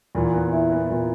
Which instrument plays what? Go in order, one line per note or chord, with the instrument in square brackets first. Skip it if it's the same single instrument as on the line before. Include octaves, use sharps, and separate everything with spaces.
[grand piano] E2 [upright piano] A#2
[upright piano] B3
E4
B3
A#2